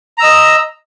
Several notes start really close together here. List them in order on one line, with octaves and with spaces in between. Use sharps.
A#5 E6 D#5